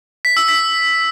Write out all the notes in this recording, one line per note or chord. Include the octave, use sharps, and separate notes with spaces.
B6
E6
B6